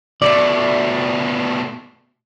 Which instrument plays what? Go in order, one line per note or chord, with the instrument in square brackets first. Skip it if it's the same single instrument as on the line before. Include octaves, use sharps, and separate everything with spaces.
[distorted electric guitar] B2 A3 [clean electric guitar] D5